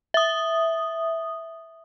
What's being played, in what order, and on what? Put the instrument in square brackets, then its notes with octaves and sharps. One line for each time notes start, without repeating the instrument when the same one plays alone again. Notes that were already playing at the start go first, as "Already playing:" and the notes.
[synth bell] E5 D#6